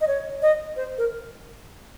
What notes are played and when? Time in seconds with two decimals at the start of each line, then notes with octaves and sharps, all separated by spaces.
0.01 D#5
0.08 C#5
0.42 D#5
0.76 C5
0.98 A#4